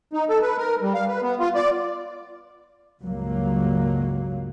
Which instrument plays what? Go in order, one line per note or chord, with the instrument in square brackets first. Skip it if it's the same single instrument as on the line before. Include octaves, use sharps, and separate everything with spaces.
[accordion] D#4
A4
B4
A#4
G3
F5
B4
B3
F4
D5
[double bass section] C#2 G2 A#2 F#3 A#3